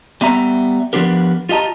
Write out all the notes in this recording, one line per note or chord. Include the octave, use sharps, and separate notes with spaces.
G3 B3 E5 A#5
F3 B3 D4 G4 A#4
F4 G4 D#5 A5 A#5